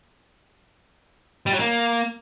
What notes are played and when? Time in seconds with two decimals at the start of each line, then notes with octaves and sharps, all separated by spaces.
1.46 G3
1.53 F#3
1.59 A#3